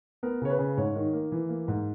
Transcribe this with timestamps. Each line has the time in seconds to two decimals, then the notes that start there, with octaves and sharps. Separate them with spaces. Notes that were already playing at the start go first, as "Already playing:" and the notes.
0.23 B3 A#4
0.42 C#3 C#5
0.50 B4
0.59 C#3
0.77 G#2 C#5
0.96 D#3
1.13 A#3
1.32 E3
1.49 A#3
1.68 G#2